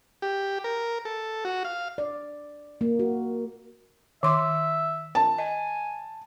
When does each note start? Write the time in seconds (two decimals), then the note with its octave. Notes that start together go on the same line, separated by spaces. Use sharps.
0.22 G4
0.64 A#4
1.05 A4
1.45 F#4
1.65 F5
1.98 D5
2.81 A#3
2.99 F#4
4.23 D#3 E5 C6 D6
5.15 A5
5.38 D#5 G#5